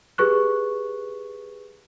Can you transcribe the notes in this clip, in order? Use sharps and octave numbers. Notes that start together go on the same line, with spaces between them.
G4 G#4 B4 C#6 F#6